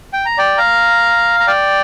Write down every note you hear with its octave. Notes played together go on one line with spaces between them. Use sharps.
G5
A#5
D5 G5
F5 A#5
A#5
D5 G5